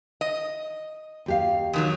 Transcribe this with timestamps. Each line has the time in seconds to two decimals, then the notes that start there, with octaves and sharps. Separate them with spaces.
0.21 D#5
1.26 D#2 G4 F5
1.73 E2 D#3 F#3